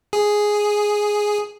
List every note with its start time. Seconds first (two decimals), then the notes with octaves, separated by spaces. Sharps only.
0.13 G#4